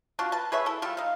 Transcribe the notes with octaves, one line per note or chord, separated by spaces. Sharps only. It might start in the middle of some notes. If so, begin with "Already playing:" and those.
D4 F4 F#4 A5
B4 A5
G#4 B4 C#5 E5
E4 A4
G3 F4 A4
D#4 F5